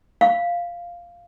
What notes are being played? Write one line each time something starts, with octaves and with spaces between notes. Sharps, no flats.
F5